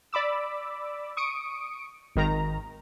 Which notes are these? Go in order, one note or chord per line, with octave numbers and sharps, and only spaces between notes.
D5 B5 D6 E6
C#6 D#6 C#7 D7
G#1 D#3 A#5